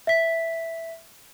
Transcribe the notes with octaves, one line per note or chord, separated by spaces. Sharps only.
E5 B6